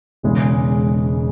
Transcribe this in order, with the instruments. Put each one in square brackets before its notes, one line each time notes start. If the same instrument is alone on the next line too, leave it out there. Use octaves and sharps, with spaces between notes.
[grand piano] E1 E2 C#3 G#3